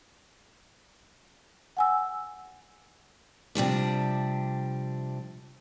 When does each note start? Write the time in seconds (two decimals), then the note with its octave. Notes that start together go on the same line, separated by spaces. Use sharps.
1.77 F#5 G#5 E6
3.55 C3 F3 G3 D4